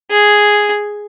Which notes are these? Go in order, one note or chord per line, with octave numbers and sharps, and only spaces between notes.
G#4